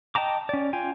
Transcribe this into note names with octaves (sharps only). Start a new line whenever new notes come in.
D#5 G5 A5 A#5 D6
C#4 D5
F4 G5 G#5